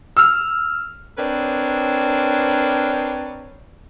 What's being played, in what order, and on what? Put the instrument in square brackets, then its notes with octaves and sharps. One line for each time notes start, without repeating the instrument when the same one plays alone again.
[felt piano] E6 F6
[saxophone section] C4 D4 A#4 B4 C#5 D5